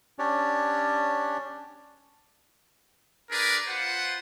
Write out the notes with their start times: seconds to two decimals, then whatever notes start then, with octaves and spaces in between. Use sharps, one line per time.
0.19 C#4 D4 G4 C#5 D5
3.30 D4 G#4 A#4 B4 D5
3.68 F4 B4 C5 F#5